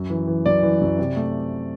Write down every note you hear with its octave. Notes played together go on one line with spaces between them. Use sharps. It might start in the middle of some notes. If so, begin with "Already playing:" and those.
Already playing: F#2
E3
E3
F#2 D5
E3
F#2
C3
A3